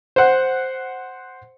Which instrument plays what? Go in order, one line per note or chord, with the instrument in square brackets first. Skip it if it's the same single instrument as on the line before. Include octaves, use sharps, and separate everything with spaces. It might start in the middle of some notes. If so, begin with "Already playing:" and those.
[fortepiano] C5 F#5